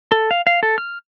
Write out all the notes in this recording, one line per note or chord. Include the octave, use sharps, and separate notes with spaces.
A4
F5
F5
A4
F6